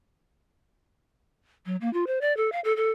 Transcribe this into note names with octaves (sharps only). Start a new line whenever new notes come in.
F#3
A#3
F4
C5
D5
A4
F5
A4
A4